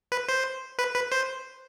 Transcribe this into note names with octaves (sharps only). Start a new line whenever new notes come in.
B4
C5
B4
B4
C5